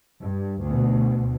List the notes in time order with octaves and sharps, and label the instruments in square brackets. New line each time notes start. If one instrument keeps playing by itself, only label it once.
[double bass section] G2
D2 B2